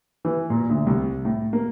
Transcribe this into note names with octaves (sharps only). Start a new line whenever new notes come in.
E3
A#2
D2
C2
A2
A#3